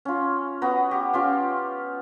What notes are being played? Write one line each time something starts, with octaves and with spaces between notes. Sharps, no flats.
C#4 F4
B3 F#4 A#5
G4
C#4 F4 G4